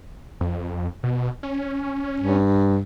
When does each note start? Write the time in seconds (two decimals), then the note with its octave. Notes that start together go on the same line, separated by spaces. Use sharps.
0.41 F2
1.03 B2
1.43 C#4
2.20 G2